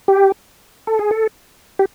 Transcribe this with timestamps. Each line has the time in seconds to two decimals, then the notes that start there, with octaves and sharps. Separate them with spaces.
0.08 G4
0.87 A4
0.99 G#4
1.11 A4
1.79 G4